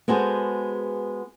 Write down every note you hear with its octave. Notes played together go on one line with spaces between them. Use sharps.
G#3 B3 F#4 G#4 A4 C5